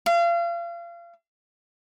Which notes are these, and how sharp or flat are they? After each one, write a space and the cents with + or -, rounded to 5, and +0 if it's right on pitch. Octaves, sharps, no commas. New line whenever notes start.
F5 -35